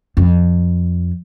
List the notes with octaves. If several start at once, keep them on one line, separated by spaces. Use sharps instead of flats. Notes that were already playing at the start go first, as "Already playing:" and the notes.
F2